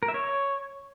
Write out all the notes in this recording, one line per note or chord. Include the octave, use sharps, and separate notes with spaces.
A#4
E5
C#5